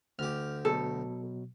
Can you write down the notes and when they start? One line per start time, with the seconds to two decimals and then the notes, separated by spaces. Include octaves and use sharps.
0.19 D2 G4 F6
0.65 B2 F#3 A4